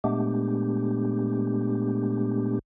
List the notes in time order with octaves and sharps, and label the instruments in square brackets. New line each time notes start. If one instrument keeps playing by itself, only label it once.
[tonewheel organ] A#2 G#3 A3 B3 D4 G4